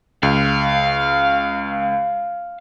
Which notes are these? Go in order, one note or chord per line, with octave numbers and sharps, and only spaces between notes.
C#2 F5